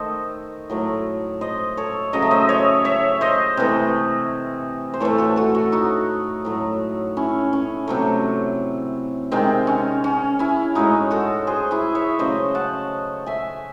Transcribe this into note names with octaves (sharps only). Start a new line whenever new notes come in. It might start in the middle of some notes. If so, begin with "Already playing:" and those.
Already playing: D#3 A3 A4 C5 D#5
A2 F#3 A3
C5 D#5
A4 C#5
C#3 F#3 A3 D#5
E5
C5 D#5
C#5 E5
C#5 E5
C5 D#5
C3 E3 A3
C5
A2 E3 A3 A4 C#5
F#4 A4
F#4 A4
F#4 A4
D#4 F#4
A2 F#3 A3
C#4 E4
C#4
C3 F#3 A3
C3 D#3 G#3 C4
C#4
C#4
C#4 E4
A2 G#3 D#4 F#4
F#4 A4
G#4 C5
E4 G#4
C#5 E5
C#3 F#3 A3 C5 D#5
F#5 A5
E5 G#5